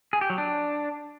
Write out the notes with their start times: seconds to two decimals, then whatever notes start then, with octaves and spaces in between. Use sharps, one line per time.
0.13 G#4
0.21 G4
0.30 F#3
0.38 D4